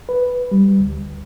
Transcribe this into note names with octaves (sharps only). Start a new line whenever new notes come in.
B4
G3
D2